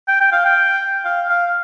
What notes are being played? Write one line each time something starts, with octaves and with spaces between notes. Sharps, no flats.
G5
G5
F5
G5
F5
F5